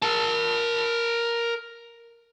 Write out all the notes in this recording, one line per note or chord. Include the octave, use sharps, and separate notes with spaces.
A#4 A5